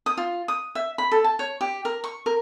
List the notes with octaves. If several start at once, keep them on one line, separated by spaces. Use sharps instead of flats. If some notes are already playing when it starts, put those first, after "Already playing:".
D#6
F4
D#6
E5
B5
A4
A5
C#5
G4
A#4
C#6
A#4